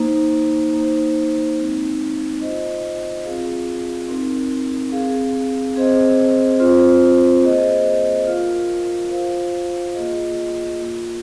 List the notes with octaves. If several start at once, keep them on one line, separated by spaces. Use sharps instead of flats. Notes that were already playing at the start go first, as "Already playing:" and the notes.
Already playing: A#3 D#4 C5
A#3 D#4 C5
G#3 C4 D#4
F4 C5 D#5
C4 F4 G#4 F5
C4 D#4 A#4
C4 G#4 F5
C4 G#4 C5 D#5
C4 F4 C5
A#3 G#4 C5 D#5
F4 A#4 F5
F4 C5 F5
A#3 F4 G#4 D#5
A#3 F4 A#4